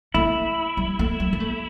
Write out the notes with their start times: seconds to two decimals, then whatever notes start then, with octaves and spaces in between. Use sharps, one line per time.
0.14 A3 E4
0.77 G3
0.99 A3
1.20 G3
1.33 B3
1.40 A3